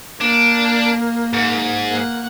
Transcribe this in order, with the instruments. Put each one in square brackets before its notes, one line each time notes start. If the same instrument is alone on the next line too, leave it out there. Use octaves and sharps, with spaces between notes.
[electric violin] A#3 [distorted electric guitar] D4
[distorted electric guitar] G#2
[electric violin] A#3 F#5